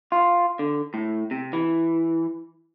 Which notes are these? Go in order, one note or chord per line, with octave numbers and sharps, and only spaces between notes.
F4
D3
A2
C3
E3